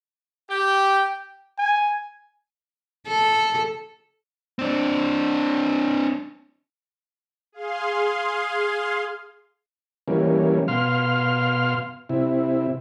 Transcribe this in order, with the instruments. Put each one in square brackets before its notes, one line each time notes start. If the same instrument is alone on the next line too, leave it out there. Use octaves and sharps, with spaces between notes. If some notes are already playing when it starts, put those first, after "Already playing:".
[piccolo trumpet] G4 [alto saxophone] G5
[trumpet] G#5
[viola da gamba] A4
[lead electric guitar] C4 D4
[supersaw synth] G#4 F5 C6
[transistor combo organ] E3 G3 A#3 C#4
B2 F5 C6 F6
C3 E4